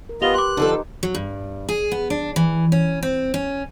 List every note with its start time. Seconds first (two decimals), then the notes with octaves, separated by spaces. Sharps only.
0.09 A#4
0.22 B3 F4 G4 B4 D#5 F7 G7
0.34 C6 D6 F#6
0.57 D3 F3 D#4 A4
1.03 F#3
1.15 G2
1.69 G#4
1.92 B3
2.10 D4
2.36 E3
2.72 C#4
3.03 C4
3.34 C#4